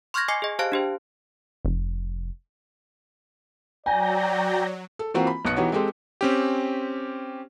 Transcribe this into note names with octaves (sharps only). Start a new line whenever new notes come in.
C6 C#6 F6 G6 G#6 A#6
D#5 G#5 D6 C7 C#7
G#4 D#5
G4 C5 F5 A5 F#6 D7
D4 G4 C5
F1
F#3 D5 G5 G#5 A#5
A4
E3 A#3 C4 F4 F#4
B5
B1 B2 F#6 C#7
E3 B3 D#4 F#4 G4 C#5
G#3 C4 G4 A4 C5
C4 C#4 G4